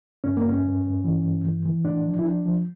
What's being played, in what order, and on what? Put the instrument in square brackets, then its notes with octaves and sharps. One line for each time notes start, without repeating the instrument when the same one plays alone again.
[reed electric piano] G2 C#4
A#3
G2 C#4
G2
G2
E3
G2
E3
E3
A2 D4
F3
E4
F3 D4
F3